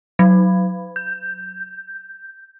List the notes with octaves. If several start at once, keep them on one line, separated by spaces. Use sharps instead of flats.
F#3
G6